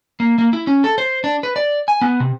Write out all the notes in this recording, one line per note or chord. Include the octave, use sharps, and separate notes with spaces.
A#3
A#3
E4
C#4
A4
C5
D4
B4
D5
G#5
B3
C3